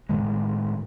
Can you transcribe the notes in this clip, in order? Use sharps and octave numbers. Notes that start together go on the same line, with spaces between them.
A2 D#3 G#3